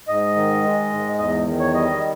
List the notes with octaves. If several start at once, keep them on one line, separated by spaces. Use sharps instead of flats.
G#2 D#5
D#3
G#3
G#2
E2 D#5
D#3
C#5
G3 D#5